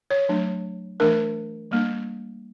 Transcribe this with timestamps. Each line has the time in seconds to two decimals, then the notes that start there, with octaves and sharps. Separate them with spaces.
0.10 C#5
0.29 F#3 A3 D4
1.00 E3 A3 D4 A#4
1.71 G3 A#3 D4